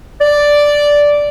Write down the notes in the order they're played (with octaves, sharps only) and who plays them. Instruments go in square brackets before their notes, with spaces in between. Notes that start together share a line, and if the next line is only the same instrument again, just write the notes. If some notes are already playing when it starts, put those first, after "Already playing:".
[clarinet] D5